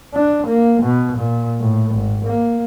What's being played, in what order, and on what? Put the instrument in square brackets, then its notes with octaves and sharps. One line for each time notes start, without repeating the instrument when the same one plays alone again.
[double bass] D4
A#3
B2
A#2
A2
G#1
A#3